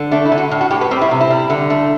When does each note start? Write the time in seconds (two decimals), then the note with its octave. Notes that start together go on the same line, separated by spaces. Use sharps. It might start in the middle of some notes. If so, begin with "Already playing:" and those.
Already playing: D3
0.11 A3 D4
0.25 E4
0.32 D3
0.38 F#4
0.51 A2
0.61 F#4
0.71 A2 G4
0.81 B4
0.91 G3 C4
1.01 E4
1.11 C3
1.20 E4
1.30 G3
1.50 D3
1.70 A3